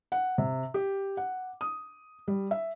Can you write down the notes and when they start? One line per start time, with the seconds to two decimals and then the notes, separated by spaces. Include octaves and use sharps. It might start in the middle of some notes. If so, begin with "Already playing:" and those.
0.12 F#5
0.38 C3
0.74 G4
1.17 F#5
1.61 D#6
2.28 G3
2.51 E5